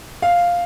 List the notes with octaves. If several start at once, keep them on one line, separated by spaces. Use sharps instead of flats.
F5